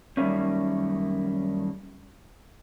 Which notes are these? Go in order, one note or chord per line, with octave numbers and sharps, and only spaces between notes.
F#2 D#3 G3 A3 A#3 C#4